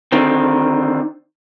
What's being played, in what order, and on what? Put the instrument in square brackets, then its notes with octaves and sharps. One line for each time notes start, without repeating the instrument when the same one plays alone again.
[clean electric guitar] D3 D#3 C4